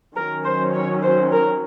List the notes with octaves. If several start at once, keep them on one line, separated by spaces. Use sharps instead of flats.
D#3 F#3 C#4 A#4
C5
C#5
C5
A#4